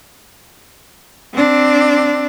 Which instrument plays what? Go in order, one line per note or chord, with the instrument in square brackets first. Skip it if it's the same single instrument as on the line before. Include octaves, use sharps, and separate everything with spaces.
[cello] C4 D4